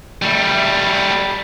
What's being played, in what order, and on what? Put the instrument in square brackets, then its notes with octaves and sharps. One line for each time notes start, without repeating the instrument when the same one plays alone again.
[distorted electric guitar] G3 A3